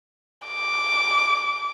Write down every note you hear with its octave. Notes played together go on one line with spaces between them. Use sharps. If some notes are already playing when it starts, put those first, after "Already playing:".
D6